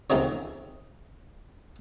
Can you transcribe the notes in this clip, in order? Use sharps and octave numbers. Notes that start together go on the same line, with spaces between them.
C#2 A3 C4 D#4 C#5